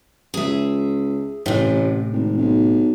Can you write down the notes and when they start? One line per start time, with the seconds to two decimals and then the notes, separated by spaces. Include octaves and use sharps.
0.34 C#2 G#4 E5
1.46 A1 A2 C3
2.13 G#1
2.37 B1